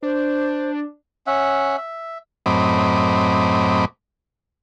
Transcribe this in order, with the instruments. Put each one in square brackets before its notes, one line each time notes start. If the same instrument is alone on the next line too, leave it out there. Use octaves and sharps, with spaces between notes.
[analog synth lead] D4 [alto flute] C5
[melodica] C#4 E5 F#5
E5
[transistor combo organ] F#2 A2 C4 D#5 B5 D6